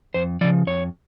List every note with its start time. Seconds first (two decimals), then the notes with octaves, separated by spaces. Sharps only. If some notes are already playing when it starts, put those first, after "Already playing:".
0.14 F2 C5
0.41 F3 D5
0.44 C#3
0.67 F2 C#5